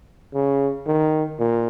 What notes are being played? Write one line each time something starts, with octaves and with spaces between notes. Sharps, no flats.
C#3
D#3
A#2